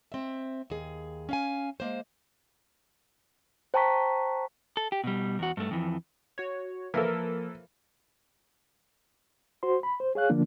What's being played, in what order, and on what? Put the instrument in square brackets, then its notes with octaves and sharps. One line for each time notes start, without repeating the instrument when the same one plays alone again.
[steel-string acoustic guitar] C4 E5
D#2 G#4
C#4 F5 G#5
G#3 A#3 C5
[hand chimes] C5 G5 A5 A#5 C#6 B6
[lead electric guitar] A4
G4
B2 G3
E2 F#4
G2 A3
F2 E3
[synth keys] F#4 C#5
[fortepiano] E3 A4 [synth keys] F3 A#3 A#4
[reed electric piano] F#4 C5 C6
B5
C5
G#4 C#5 F5 F#6
D3 F3 A#3 D4